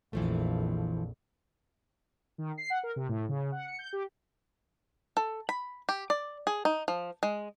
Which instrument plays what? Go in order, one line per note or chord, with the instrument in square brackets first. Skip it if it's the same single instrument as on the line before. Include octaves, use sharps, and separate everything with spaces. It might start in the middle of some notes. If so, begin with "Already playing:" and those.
[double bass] A#1 F2 [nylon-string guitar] E3 F3 A3
[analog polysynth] D#3
C7
F#5
A#4
C3
A2
C#3
F#5
C#7
G6
G4
[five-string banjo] A4
B5
G4
D5
G#4
D#4
F3
G#3